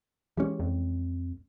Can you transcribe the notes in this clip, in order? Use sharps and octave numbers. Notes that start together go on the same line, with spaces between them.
E3 G#3 C#4 G4
F2